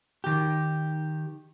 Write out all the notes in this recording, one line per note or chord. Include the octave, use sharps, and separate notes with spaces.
D#3 G4